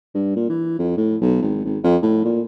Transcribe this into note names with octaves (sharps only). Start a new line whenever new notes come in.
G2
A#2
E3
F2
A2
B1
G#1
G#1
F2
A2
A#2